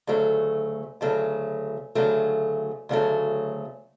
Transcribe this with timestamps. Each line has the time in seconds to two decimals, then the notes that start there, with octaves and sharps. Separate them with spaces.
0.07 D2 C#3 F#3 A3
1.01 D2 C#3 F#3 A3
1.95 D2 C#3 F#3 A3
2.89 D2 C#3 F#3 A3